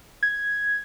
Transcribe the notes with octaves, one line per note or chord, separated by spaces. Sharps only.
G#6